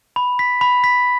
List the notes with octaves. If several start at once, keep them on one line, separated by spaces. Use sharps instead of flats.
B5
B6
B5
B6